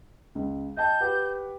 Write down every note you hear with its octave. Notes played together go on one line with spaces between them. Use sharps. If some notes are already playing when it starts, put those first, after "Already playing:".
C#2
D#5 G5 A5 G6
G4 B4 F#5